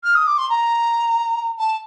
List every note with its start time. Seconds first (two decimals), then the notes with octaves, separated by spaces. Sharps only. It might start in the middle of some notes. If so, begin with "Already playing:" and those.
0.03 F6
0.15 D#6
0.27 D6
0.37 C6
0.49 A#5
1.58 A5